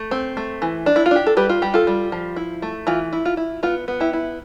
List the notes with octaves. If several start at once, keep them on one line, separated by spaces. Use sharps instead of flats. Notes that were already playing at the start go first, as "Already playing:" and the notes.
Already playing: A3
C4
A3
E3
D4
E4
F4
D4 G4
A4
G3 G4 B4
F4
G3 G4
F4 A4
G3
F3
E4
A3
E3 F4
E4
F4
E4
B3 F4
B3
E4 G4
E4